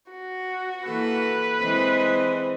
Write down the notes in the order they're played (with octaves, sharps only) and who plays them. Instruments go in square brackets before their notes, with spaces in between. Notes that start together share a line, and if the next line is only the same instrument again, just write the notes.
[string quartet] F#4
[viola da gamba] E3 A#3 A4 [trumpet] B4
[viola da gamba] E3 G#3 D#5 [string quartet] C4